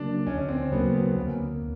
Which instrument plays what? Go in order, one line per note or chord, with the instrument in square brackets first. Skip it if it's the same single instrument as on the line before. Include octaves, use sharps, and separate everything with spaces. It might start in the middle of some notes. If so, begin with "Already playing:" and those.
Already playing: [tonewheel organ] C#3 F#3 A#3 [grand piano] D4
[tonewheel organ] D2 [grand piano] C#4
[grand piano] C#4
C4
[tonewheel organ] C#3 F#3 A#3 [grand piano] B3
[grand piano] B3
B3
[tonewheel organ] D2 [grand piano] A#3